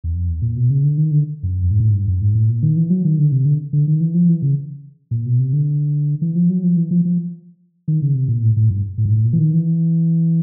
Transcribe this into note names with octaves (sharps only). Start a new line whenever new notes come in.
E2
F2
E2
A#2
B2
C#3
D3
D#3
D3
F#2
F2
G#2
A2
G#2
G2
F#2
G#2
A2
A#2
D#3
E3
F#3
D#3
D3
C3
D3
D3
D#3
E3
F3
E3
C#3
A#2
B2
C3
D3
E3
F3
F#3
F3
E3
F3
F3
D#3
C#3
C3
A#2
A2
A2
G2
A2
G#2
A2
A#2
E3
D#3
E3